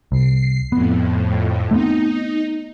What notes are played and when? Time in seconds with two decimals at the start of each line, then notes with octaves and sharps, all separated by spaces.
0.12 C2 C7
0.72 F2 A2 B3
1.71 A3 B3 C4 D#4